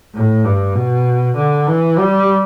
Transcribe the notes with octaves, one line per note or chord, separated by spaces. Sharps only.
A2
G2
B2
D3
E3
G3